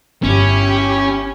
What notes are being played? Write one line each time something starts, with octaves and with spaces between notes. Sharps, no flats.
G1 C#4 E4 G4